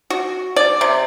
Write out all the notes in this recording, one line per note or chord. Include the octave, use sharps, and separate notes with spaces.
F#4
D5
C3